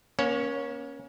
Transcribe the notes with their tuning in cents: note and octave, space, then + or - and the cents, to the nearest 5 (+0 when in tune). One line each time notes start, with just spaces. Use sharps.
A#3 +35 C#4 +0 C#5 +0